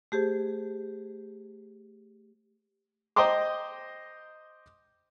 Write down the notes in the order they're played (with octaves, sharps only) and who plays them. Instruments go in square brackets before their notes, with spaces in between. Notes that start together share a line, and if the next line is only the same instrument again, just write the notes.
[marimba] A3 G4 G#4 C5
[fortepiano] C5 D#5 G5 A#5 C6 D6